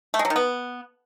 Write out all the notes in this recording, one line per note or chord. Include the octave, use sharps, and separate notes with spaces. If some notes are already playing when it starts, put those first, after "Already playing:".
A3
G#3
F#3
D#3
B3